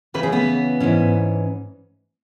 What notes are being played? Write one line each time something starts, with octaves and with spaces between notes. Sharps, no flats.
C#3 E3 C#4 B4
G#4
B3 B4
G#2 E3 C#4